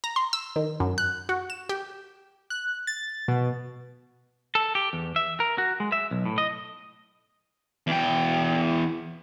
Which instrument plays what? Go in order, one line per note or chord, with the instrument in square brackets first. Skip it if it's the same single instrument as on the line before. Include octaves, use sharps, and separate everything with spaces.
[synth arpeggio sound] A#5
C6
E6
D#3
F#2
F#6
F#4
E7
G4
[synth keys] F#6
A6
B2
[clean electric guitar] A4
G4
E2
E5
A#4
F#4
G#3
E5
B1
A2
D#5
[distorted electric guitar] E2 G5